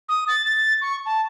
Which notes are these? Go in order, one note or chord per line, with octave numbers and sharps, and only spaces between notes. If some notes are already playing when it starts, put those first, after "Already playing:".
D#6
A6
A6
C#6
A5